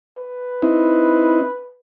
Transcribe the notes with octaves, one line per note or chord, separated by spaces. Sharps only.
B4
C4 D#4 E4